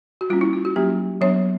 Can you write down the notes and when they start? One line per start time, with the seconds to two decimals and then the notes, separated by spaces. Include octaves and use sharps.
0.21 F#4
0.30 G3 A#3 C#4 F4
0.41 E4
0.53 F4
0.65 F#4
0.76 F#3 A#3 C#4 G4
1.21 F#3 B3 D4 C#5